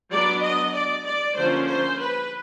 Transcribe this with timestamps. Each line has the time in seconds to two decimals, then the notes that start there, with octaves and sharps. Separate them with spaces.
0.11 F#3 B3 D4 D5
0.42 D#5
0.74 D5
1.06 D5
1.37 D3 F3 A#3 C#4 C5
1.67 C5
1.99 B4